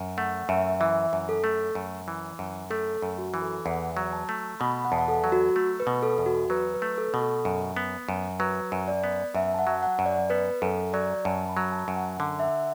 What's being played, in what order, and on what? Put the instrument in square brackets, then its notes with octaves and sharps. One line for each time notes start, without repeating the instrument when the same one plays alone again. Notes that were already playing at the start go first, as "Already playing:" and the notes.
Already playing: [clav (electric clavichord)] F#2
[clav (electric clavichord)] A3 [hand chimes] F#5
[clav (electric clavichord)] F#2 [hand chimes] E5
[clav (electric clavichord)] E3 [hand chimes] E5
[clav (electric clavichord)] F#2
[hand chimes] A4
[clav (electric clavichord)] A3
F#2
E3
F#2
[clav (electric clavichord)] A3 [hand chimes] A4
[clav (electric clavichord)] F#2
[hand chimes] F#4
[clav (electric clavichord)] E3
[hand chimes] A4
[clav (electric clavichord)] E2 [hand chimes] F#5
[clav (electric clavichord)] F#3
[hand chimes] A5
[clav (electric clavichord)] A3
[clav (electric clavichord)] B2 [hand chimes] B5
[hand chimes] F#5
[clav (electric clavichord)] E2 [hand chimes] A5
[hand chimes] F#5
A4
[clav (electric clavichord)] F#3
[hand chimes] F#4
[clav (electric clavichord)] A3
[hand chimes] B4
[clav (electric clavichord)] B2
[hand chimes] A4
[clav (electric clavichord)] E2
[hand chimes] F#4
[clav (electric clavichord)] F#3 [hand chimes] B4
[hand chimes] B4
[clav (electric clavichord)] A3
[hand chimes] A4
[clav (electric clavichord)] B2
[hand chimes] A4
[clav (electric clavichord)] F#2
B3
F#2
[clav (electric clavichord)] F#3 [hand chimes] B4
[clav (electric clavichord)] F#2
[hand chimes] D5
[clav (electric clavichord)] B3
[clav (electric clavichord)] F#2 [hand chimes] E5
[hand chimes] A5
F#5
[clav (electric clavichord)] F#3
[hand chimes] F#5
[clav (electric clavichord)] F#2
[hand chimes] D5
[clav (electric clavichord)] B3 [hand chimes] B4
[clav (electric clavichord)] F#2 [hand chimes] A4
[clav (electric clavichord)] F#3 [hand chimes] D5
[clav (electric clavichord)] F#2 [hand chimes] A5
[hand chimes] B5
[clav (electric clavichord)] F#3
[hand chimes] A5
[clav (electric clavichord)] F#2
[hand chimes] F#5
[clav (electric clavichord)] D3
[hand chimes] E5
F#5